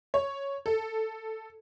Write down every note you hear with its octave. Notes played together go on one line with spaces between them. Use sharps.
C#5
A4